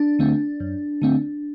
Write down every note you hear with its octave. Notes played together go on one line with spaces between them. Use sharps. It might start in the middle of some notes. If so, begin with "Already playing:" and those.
Already playing: D4
D3 A3 C4
F#2
D3 A3 C4